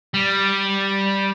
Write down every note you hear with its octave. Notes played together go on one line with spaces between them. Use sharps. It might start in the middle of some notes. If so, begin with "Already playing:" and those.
G3